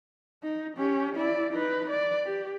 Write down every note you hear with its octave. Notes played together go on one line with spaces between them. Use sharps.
D#4
C#4 G4
E4 D5
D#4 B4
D5
G4